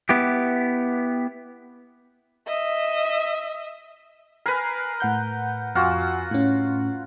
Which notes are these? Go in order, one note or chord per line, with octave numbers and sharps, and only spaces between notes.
B3 E4 G4
D#5 E5
A#4 B4 G#5 C7
A2 F#5 G6
F2 F4 F#4 G#5 E6
A2 C#4